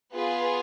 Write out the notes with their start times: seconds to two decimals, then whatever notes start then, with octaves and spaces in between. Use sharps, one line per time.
0.13 B3 F4 G#4 B4